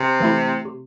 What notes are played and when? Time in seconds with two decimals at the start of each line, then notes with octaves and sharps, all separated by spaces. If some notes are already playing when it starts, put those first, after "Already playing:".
Already playing: C3
0.20 E3 A3 E4
0.65 C3